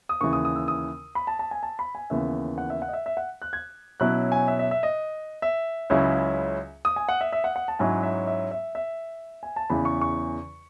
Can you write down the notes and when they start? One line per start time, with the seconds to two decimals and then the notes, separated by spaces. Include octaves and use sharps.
0.09 D#6
0.21 D#2 C#3 E3 C#6
0.33 D#6
0.45 D#6
0.56 E6
0.68 D#6
1.15 B5
1.27 A5
1.39 A5
1.51 G#5
1.63 A5
1.79 B5
1.95 G#5
2.10 D#2 C#3 E3 B3 E5
2.58 F#5
2.70 E5
2.82 F#5
2.88 D#5
2.93 E5
3.06 E5
3.17 F#5
3.42 F#6
3.53 G#6
4.00 B2 F#3 C#4 E4 F#6
4.32 G#5
4.48 E5
4.59 E5
4.71 E5
4.83 D#5
5.42 E5
5.90 C#2 C#3 F#3 C#4 E4
6.85 D#6
6.96 G#5
7.09 F#5
7.21 E5
7.33 E5
7.44 F#5
7.56 F#5
7.68 A5
7.79 G#2 F#3 C#4 E4 G#5
8.03 E5
8.27 E5
8.51 E5
8.75 E5
9.43 G#5
9.56 A5
9.70 E2 C#3 E3 B5
9.85 C#6
10.01 C#6